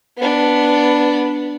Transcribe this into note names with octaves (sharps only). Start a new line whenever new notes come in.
B3 D4